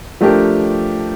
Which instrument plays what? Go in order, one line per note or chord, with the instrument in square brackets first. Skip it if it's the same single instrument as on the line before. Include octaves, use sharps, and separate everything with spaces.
[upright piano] F3 A3 D4 G4 A#4